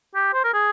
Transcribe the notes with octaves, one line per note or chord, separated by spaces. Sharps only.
G4
C5
A#4
G#4